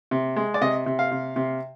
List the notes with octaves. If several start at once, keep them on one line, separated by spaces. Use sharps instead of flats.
C3
G#3
D5
C3 D#5
C3
F5
C3
C3